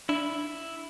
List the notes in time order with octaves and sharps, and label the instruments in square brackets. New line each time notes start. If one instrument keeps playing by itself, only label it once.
[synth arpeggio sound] D4 [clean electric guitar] E4